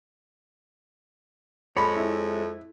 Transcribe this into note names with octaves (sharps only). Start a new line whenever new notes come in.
F2 G#3 C#5 B5
E4